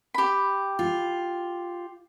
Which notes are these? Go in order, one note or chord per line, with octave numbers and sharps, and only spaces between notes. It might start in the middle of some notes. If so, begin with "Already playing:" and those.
G4 B5
F4